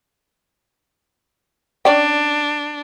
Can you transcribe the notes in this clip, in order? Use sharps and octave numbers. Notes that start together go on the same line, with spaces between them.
C#4 D4 D5 G5